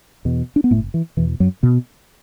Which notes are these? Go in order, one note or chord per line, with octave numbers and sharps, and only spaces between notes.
E2 B2
D4
B3
F#1 A2 A3
E3
E2 B2 E3
F#2 F#3
B2 B3